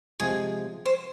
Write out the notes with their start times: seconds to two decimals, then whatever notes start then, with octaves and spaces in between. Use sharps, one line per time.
0.20 C3 F3 G#3 G#4
0.86 C5